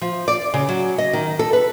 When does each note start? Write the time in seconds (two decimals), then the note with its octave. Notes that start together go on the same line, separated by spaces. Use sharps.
0.02 F3
0.28 D5
0.54 C#3
0.69 F#3
0.98 D#5
1.13 D#3
1.39 A4
1.53 B4